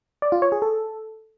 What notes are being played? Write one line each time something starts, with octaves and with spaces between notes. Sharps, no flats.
D5
F4
C#5
G#4
A4